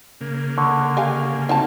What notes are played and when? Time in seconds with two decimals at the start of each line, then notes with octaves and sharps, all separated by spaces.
0.21 C#3 A#3
0.58 D3 C#6
0.97 G4 F5 G#5
1.49 C4 D#4 F#4 A5